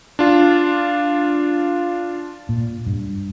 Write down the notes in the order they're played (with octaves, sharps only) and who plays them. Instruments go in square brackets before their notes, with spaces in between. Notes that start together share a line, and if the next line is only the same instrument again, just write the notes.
[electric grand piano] D4 F4
[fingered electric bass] A#2
G2